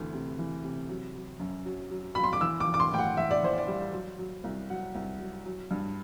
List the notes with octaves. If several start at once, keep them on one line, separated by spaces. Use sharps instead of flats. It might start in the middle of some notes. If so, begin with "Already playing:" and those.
Already playing: D2 C3 E3
C3
E3
C3
F#3
F#3
F#2
F#3
F#3
F#3 B5
C6
D6
E3 E6
D6
E3
D6
C6
A2 G5
F#5
E3 E5
D5
E3 C5
D5
G3
F#3
F#3
C2
F#3 F#5
C2
F#3
F#3
G2